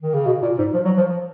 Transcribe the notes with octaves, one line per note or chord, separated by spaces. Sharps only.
D#3
C#3
B2
A#2
G#2
F3
F#3
F3